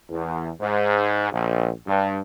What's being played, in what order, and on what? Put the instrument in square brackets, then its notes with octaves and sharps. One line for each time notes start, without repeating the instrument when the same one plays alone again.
[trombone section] E2
G#2
A#1
G2